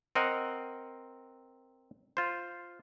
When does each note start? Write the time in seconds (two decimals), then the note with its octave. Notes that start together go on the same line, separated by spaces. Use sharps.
0.15 C4 A#4 D#5 F#5
2.17 F4 C5